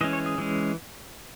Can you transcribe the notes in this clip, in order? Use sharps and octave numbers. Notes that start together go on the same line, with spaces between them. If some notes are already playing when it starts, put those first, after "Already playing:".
E3 G#3 C#4 D#5
C#5
G#4
E3 G#3 C#4